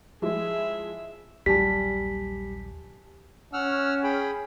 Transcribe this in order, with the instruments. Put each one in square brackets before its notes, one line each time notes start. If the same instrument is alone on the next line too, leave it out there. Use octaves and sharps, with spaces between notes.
[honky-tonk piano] F3 G#3 E4 [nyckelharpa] G#4 E5
[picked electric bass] A#1 D#2 F#3 [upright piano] G3 [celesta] G4 G#5 A5 [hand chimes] B6
[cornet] C#4 [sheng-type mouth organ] F#5 E6 F6
[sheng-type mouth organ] G#4 G5 B5